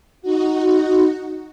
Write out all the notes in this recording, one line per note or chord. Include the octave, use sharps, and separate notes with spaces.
D#4 F#4